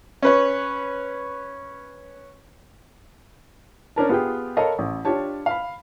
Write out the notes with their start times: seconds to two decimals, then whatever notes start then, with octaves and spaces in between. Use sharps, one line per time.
0.22 C#4 B4 C#5
3.96 C#4 D4 A#4 A5
4.09 B3 F4 G4 G#4 G5
4.57 A4 A#4 C#5 D#5 F5 B5
4.79 A1
5.05 D4 F4 G4 C#5 A5
5.46 F5 B5